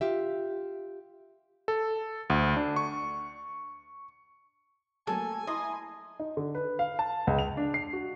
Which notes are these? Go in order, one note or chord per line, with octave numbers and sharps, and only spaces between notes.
F4 G4 E5
A4
D2
D4
C#6
F#3 A3 A#3 A4 G#5
E4 D#5 A#5 C6
D#4
D3
B4
F5
A5
C#2
F7
D4
C7
F#4